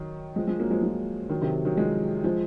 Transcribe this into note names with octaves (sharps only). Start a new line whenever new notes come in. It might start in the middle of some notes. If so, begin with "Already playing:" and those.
Already playing: D#3 F#3
F3 G#3
F3 G#3
F#3 A#3
F3 G#3
F3 G#3
D#3 F#3
C3 D#3
D#3 F#3
F3 G#3
F3 G#3